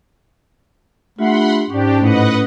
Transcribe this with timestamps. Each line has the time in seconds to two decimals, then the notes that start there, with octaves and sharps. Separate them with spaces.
1.19 A3 D4 F4 G4 F#5 B5 C6
1.70 G#2 C#4 D4 G4
2.01 A2 B4 D#5 F#5